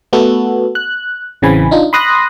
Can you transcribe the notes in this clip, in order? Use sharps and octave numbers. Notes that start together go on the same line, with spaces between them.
A3 B3 F#4 A4
F#6
A1 C#3 E3 C4 G#5 B5
D4 D#4 F4
B5 C6 D#6 F#6 A#6